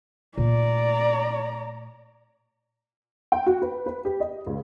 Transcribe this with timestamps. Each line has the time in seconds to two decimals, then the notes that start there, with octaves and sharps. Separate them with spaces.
0.38 A#2 A3 D5 A#5
3.32 G5
3.46 F#4
3.62 B4
3.86 B4
4.05 G4
4.20 D#5
4.47 C#2